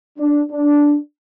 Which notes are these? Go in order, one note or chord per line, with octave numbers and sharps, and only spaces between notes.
D4
D4